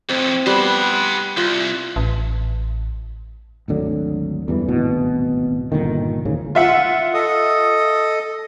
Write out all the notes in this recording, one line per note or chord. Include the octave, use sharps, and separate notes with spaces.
F2 A2 C4
G3 B3 C5 F#5
C2 F4
A1
G#1 D2 D3 F#3
E2 G2 E3
D1 G#1 B2
G1 A#2 D3 D#3
A1 D#2 G#2 C#3
F4 E5 F#5
A4 D#5 D#6